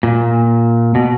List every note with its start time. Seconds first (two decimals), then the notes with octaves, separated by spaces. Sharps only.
0.03 A#2
0.95 B2